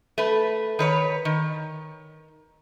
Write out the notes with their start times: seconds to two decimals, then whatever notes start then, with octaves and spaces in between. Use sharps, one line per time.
0.18 A3 B4
0.79 D#3 B4 C#5
1.25 D#3